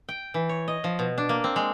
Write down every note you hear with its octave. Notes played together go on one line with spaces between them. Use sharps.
G5
E3
C#5
D#5
F3
B2
D4
A#3
C4
G#3